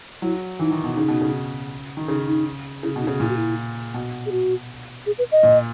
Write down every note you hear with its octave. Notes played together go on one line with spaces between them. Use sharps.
F#3 E4
E3 D#4
D#3
B2
C#3 D#4
B2
C#3
D#3
C#3 D#4
D#4
C#3 E4
B2
D#4
C#3
A#2 E4
F#4
E4
B2
G#4
F#4
G#4
B4
D#5
A#2